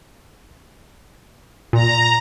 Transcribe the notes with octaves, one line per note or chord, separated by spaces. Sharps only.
A#2 A#5